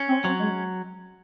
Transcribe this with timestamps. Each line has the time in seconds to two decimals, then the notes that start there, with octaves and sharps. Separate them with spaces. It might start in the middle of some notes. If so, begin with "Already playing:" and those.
Already playing: C#4
0.09 C4
0.24 F#3 C4
0.40 G#3